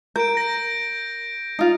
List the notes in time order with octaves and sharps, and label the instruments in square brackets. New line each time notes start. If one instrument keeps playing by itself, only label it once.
[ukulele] A#4 [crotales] G6 D7
[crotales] A#6
[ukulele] D#4 F4